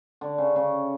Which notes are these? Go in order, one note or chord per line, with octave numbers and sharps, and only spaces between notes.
D3
C#3
C#3